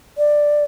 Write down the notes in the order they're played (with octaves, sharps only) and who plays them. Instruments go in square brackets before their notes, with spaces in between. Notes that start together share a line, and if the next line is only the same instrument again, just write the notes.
[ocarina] D5